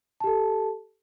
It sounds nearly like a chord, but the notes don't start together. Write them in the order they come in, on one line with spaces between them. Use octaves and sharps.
A5 G4 A4